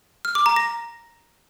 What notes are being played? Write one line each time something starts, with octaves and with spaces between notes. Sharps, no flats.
F6
D6
A#5
A#6